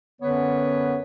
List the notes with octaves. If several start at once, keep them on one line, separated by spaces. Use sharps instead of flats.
F#2 D3 B3 C#4 B4 C#5